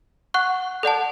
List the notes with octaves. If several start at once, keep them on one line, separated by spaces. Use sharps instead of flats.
F#5 C#6 F#6
A4 D5 F#5 A5